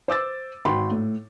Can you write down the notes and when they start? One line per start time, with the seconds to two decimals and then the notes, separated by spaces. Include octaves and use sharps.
0.08 C5 D6 E6 A6
0.65 G#1 F#4 G5 B5 C6
0.91 A2